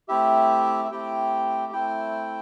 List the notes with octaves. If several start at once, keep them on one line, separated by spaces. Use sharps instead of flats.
A3 C4 E4 G4 E5
E5
A3 C4 E4 G4 G5
A3 C4 E4 G5